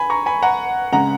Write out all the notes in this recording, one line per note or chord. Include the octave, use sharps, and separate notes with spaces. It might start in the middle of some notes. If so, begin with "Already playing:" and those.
Already playing: G#5 B5
A#5 C#6
G#5 B5
F#5 A#5
C#3 G#3 F#5 A#5